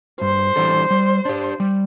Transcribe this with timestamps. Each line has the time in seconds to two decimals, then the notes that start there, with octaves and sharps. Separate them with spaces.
0.21 G2 C5
0.56 E3 G3 D4 A4
0.91 G3
1.25 D4 G4
1.60 G3